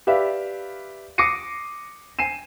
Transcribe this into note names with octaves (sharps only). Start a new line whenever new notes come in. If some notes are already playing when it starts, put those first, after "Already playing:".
G4 B4 D5 E5 F5
D6 D#6 A#6 C7 C#7 D#7
G#5 C7 D#7 E7